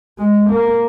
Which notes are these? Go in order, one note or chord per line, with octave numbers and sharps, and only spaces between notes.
G#3
A#3